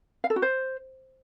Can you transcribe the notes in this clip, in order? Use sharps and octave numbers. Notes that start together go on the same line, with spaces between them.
F5
A4
F#4
C5